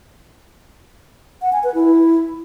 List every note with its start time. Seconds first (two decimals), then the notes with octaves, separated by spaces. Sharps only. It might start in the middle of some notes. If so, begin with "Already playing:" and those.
1.42 F#5
1.53 G#5
1.64 B4
1.74 E4